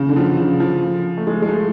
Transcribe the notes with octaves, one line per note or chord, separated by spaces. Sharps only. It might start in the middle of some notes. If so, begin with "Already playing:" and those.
Already playing: C#3
D3
F3
C#3
F3
A3
G#3
G#3
A3